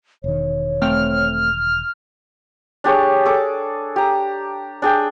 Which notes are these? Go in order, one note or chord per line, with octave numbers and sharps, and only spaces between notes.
E1 D#3 C#5
A3 C4 G5 F6
D4 G4 G#4 C#5
G#4 A4 D6
G4 A#5
D4 G#4 G5